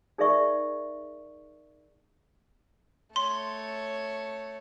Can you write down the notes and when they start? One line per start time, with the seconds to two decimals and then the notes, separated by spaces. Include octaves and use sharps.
0.18 D#4 G#4 A#4 D5 E5 C#6
3.16 A3 C#5 C6